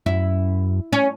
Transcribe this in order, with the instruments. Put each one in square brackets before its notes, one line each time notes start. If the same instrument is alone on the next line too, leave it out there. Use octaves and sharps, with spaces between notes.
[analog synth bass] F#2 [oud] E4
[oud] C#4